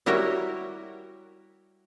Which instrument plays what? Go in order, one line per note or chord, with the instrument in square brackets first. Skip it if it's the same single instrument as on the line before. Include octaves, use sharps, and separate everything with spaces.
[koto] G3 E4 F#4 A#4 C#5 G5